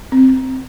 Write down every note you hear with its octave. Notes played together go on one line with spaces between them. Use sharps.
C4